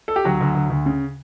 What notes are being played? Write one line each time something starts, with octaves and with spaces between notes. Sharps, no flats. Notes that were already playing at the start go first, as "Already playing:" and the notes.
A4
G4
D2 F#3 F#4
D2
D2
D2
C#3